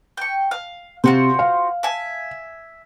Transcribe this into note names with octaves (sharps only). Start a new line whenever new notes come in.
G5 C#6
F5
C3 F4 F#4 C5
F5
E5 G#5